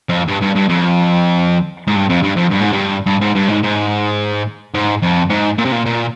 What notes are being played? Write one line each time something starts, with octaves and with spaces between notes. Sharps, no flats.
F2
G2
G2
G2
F2
G#2
G2
F2
G2
F2
G2
G#2
G2
G2
G#2
G2
G#2
G#2
G#2
F2
G#2
A#2
C3
A#2
A#2